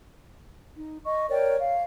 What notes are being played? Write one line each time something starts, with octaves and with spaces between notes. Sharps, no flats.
D#4
D#5 C#6
A#4 C#5 D5 G5
F5